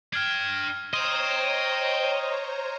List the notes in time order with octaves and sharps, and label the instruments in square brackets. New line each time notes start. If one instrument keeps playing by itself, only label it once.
[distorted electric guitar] D4 G5 [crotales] F6 G#6
[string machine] C5 C#5 A#5 [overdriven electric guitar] D#5 [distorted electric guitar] G5 C6 [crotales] D#7 E7